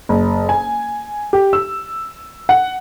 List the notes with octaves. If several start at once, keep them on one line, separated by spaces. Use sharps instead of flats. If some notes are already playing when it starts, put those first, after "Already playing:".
F#1
G#5
G4
E6
F#5